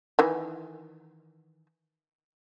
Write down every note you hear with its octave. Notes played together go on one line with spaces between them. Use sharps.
D#3 E3